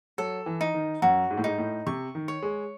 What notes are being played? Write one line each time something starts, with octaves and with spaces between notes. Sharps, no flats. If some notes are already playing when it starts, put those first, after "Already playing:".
F#3 A4
E3
D#4
D#3
F#2 F#4
G#2
A2
G#2 D#4
A2
C3 C#6
D#3
C#5
G#3